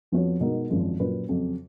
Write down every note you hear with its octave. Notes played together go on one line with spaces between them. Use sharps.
F2 F3 B3 F#4 C#5
B2 G#3 D#4 A#4
G#1 F#2 F3 G#3
A#2 F#3 C#4 F4 B4
F2 C#3 F#3